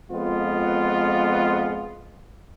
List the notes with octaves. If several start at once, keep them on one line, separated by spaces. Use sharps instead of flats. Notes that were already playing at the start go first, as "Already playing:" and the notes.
F2 G#3 B3 F4